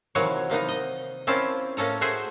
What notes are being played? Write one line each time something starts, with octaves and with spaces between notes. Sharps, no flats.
C3 D#3 E3 F#3 A#3 C#5
C3 A#3 B3 D#4
D#5
A#3 C4 C#4 E4 F4 A5
A2 A#3 C#4 A4 A#5
A3 F#4 G#4 C5 E5